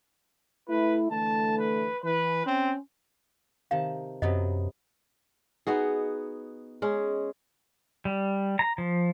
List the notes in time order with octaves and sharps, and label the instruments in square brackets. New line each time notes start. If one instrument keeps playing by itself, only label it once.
[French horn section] A3 E4 [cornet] B4
[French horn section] D3 E3 A3 [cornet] A5
[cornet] B4
[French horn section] E3 [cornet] B4
[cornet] C4 [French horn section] C#4
[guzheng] C3 D#3 A5 [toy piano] F5
[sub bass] F#2 [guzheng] C3 F#3 B3 [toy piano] D#5
[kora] B3 D#4 F#4 G#4
G#3 C#4 G#4
[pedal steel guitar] G3
A#5
F3